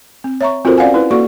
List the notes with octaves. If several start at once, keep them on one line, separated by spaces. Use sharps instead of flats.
C4
C#5 E5 A#5 C#6
C4 F4 F#4 A4 A#4 C5
C#4 D5 F5 F#5 G#5
E4 B4
A#3 F#4 A4 D5 C#6